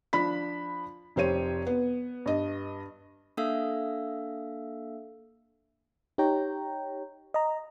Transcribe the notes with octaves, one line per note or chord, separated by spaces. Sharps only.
F3 D4 B5 B6
F1 G4 C5 C#5 D#7
B3
G2 D#5
A#3 D4 A4 E5 F5 E6
D#4 G4 C#5 G5 A#5
D#5 A#5